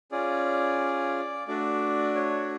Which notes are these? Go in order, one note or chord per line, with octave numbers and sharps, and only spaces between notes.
C#4 F4 G#4 D5
A3 D4 F#4 D5
C#5